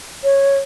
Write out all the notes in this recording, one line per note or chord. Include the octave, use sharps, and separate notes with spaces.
C#5